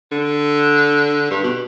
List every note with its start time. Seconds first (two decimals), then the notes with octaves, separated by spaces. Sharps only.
0.12 D3
1.31 G2
1.43 B2